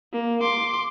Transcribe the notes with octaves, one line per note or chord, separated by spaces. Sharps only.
A#3
C6 D6